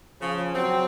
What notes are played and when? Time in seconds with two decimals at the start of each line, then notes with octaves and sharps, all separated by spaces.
0.22 C#3 F3
0.55 F#3 C4